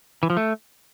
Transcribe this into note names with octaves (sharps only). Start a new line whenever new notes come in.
E3
F3
A3